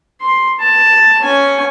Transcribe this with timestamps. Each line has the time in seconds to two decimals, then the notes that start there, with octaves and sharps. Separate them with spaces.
0.21 C6
0.59 A5
1.22 C#4 G#5